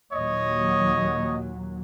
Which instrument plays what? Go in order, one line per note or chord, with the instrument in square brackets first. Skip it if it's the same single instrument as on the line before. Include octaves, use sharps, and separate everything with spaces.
[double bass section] D#2 A#2 F#3 [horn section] C#5 D#5